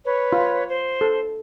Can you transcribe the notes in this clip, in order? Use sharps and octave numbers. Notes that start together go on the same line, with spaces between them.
B4 C#5
F4
C5
A4